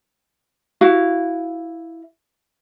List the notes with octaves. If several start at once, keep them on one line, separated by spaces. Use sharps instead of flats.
E4 F#4 F5